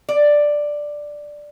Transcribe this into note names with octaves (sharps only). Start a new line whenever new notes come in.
D5